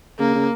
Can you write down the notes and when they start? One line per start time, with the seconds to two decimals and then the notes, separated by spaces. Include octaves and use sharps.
0.19 C#3 A#3
0.35 C#3